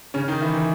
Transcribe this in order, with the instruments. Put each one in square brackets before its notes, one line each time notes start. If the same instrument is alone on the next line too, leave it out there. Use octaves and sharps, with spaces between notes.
[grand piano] C#3 C#4
D#3 D#4
E3 E4
E3 E4